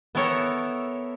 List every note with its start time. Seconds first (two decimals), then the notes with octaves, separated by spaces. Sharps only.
0.15 B3 E4 A4 A#4 C#5